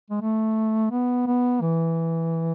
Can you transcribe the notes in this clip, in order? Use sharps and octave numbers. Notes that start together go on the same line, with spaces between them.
G#3
A3
B3
B3
E3